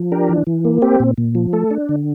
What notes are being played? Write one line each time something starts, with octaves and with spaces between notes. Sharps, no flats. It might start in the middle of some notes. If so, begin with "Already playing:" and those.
Already playing: F3
D4 G4 A#4
E3
E3
A#3
C4 G4
A#2
A#2
F3
A3 A4
D4
D3